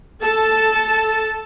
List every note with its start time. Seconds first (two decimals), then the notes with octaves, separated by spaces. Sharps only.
0.21 A4 A5